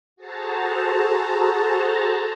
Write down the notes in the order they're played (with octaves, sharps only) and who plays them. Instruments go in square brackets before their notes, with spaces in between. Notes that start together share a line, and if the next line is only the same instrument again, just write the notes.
[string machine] F#4 G#4 A4 C5 A5 A#5